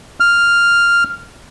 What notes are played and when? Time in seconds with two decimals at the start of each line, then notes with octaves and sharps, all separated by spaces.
0.20 F6